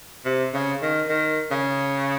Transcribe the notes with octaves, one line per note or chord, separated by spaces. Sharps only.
C3
C#3
D#3
D#3
C#3